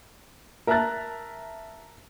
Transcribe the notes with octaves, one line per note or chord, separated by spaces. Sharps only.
A#4 E5 A5 A#5 F#6 A6